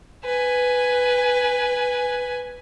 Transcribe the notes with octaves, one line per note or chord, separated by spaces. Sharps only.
B4 G#5